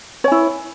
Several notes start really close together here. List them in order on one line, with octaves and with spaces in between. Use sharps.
C#5 G#5 E4